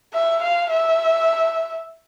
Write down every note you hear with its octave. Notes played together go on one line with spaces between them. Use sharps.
E5
F5
E5